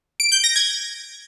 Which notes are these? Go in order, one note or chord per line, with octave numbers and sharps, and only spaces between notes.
D7
G6
A#6
G#6